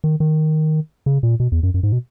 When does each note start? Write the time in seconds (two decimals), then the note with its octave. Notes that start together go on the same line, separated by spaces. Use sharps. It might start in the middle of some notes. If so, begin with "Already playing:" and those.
0.04 D#3
0.20 D#3
1.06 C#3
1.23 A#2
1.40 B2
1.52 E2
1.63 F#2
1.74 F#2
1.83 G#2
1.92 B2